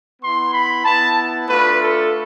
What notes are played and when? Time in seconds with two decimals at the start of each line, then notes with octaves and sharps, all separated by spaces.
0.22 B3 E4 C6
0.53 B5
0.85 B3 E4 A5
1.48 A3 D4 F4 B4
1.80 A4